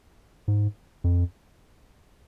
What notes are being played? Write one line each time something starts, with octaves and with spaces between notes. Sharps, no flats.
G#2
F2